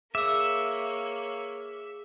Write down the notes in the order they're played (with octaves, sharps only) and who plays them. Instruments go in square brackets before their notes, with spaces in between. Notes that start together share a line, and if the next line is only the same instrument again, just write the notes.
[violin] A#3 C#5 [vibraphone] G#4 [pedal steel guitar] E5 [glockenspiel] D6 E6